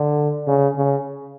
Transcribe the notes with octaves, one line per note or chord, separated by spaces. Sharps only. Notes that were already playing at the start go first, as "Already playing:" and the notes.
Already playing: D3
C#3
C#3